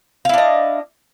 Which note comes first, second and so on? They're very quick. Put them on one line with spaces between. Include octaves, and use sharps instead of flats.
F5 E4 D4 D#5